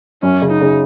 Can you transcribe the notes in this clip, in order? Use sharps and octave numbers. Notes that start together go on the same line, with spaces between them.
F#2 C#4
C#3
D#4
C#3